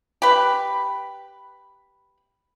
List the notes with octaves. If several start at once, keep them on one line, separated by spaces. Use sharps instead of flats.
G4 B4